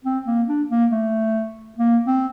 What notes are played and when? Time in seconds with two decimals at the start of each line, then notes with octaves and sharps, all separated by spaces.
0.05 C4
0.27 A#3
0.49 D4
0.70 A#3
0.92 A3
1.78 A#3
2.07 C4